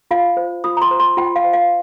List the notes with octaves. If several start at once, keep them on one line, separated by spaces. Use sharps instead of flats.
F4 F5
C5
F4 D#6
A#5
C6
C5
C6
F4 G5
F5
C5
F5